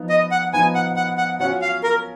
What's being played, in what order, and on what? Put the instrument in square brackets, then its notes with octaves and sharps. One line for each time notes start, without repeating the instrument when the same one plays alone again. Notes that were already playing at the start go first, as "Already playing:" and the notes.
Already playing: [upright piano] F3 B3 D#4
[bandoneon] D#5
F#5
[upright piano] F3 B3 D#4 [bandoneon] G#5
[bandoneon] F#5
F#5
F#5
[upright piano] F#3 C#4 F4 [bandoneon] F#5
[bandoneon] F5
A#4